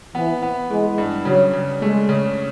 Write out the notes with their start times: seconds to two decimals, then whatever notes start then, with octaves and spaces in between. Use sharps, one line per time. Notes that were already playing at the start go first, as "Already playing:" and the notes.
0.15 E3 B3
0.43 B3
0.70 E3 G#3
0.98 G2
1.25 C#3 F#3
1.53 C#3
1.81 G#3 A3
2.09 C#3